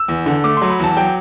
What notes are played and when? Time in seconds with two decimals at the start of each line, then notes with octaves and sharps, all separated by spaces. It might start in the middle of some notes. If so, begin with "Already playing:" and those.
Already playing: E6
0.08 E2
0.26 D3
0.44 A3 D6
0.57 F#3 C6
0.70 B5
0.79 E2 A5
0.97 F#3 G5